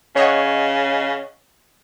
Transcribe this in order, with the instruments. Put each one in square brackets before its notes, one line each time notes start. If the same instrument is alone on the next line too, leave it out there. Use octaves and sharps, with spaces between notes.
[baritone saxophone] C#3 [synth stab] C#5 D#5 F#5